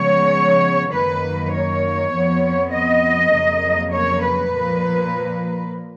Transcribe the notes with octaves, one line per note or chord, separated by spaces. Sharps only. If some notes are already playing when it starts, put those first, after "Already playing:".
Already playing: C#3 F3 G#3 B3 C#5
F#2 D#3 A#3 B4
C#5
F2 F3 B3
D#5
F2 C#3 F#3 A#3
C#5
B4
A#2 F3 A#3